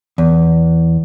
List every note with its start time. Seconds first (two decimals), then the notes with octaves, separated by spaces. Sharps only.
0.18 E2